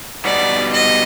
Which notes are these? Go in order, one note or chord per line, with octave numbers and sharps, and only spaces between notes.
B2 G3 B3 D#4 D5
D#5